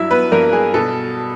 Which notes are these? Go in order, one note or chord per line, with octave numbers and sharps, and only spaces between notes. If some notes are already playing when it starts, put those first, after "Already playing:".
Already playing: G2 F#3 E4 E5
B3 B4
G2 A#3 A#4
G#4
B2 A4